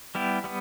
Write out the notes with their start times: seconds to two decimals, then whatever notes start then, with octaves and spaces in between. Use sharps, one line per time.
0.15 G3 B3 E4 G4
0.44 G3 B3